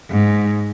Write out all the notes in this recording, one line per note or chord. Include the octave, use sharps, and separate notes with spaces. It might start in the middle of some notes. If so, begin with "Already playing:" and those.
G#2